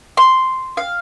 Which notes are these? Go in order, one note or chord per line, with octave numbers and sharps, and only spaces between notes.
C6
F5